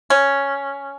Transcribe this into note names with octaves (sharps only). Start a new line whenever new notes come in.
C#4